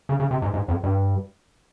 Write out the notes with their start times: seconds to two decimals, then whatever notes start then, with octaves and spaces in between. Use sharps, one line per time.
0.09 C#3
0.20 C#3
0.31 C3
0.42 G#2
0.54 G#2
0.68 F2
0.83 G2